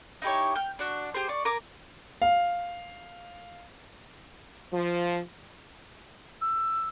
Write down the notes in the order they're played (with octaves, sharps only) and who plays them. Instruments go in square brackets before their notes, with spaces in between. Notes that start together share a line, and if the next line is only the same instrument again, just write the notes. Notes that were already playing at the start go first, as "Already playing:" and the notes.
[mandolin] D#4 E4 G4 C#5
G5 F6
D4 F#4
G4 G#4 C5
D5 C#6
A#4 G#5 D6
[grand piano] F5
[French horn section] F3
[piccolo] E6